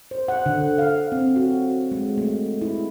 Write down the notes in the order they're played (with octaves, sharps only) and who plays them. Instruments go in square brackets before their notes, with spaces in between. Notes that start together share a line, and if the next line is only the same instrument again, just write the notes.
[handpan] C5
F#5
D3
F5
C4
F#4
G#3
A3
E4